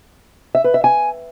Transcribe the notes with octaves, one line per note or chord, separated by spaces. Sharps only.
E5
B4
E5
G#5